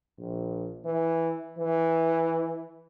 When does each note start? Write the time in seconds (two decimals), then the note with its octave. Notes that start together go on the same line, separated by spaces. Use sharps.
0.18 A#1
0.85 E3
1.58 E3